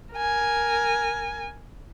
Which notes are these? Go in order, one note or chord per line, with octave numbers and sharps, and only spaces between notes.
A#4 G#5